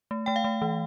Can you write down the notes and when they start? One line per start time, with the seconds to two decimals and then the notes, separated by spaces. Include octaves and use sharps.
0.11 A3
0.26 A3 G5
0.36 F5
0.44 A3
0.62 E3